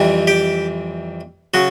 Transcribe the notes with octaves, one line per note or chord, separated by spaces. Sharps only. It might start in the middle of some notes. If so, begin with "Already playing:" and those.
Already playing: F2 C3 E3 G3
G4
C#3 F#3 F#4